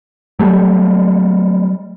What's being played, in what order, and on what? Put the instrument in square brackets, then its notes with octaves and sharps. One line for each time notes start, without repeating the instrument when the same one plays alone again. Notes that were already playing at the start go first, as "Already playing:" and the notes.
[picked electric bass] F#3 G3 A3